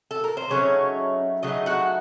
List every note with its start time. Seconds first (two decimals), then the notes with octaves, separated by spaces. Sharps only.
0.11 A4
0.24 A#4
0.37 C5
0.50 C#3 F#3 A3 C#4 D#4 C#5
1.43 C#3 F#3 A3 D#4 D#5
1.66 F#4 F#5